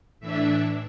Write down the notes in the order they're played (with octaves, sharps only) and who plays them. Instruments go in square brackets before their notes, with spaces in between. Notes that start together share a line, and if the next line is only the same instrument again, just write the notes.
[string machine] A2 E3 D4 E5